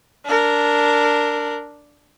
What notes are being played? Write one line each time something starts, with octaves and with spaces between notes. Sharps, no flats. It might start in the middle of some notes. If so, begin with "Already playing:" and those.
D4 A#4